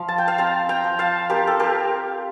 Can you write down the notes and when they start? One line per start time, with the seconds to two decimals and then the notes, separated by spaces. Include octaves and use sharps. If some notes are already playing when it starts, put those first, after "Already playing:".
Already playing: F3 F5
0.08 A5
0.18 G5
0.27 F5 A5
0.38 C4 G5 A#5
0.69 G5 A#5
0.84 F3
0.99 F5 A5
1.29 C4 G4 A#4
1.47 A4
1.60 G4 A#4